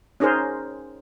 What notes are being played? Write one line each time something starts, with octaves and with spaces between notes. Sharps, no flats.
C#4 D#4 G#4 A#4 C5